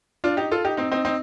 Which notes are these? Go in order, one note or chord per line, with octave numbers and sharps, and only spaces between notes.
D4 F4
D#4 G4
F4 A4
D#4 G4
C4 D#4
C4 D#4
C4 D#4